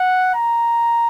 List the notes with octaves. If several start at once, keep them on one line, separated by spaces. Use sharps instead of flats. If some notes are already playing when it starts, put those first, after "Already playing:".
Already playing: F#5
A#5